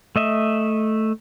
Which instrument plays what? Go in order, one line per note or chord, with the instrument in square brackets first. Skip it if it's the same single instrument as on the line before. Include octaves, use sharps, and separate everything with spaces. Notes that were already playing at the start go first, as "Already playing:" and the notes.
[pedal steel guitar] A3 D#5 E5